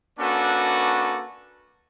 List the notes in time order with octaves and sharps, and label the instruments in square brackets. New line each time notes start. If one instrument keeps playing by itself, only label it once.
[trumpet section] A#3 C#4 D4 F#4 A4 B4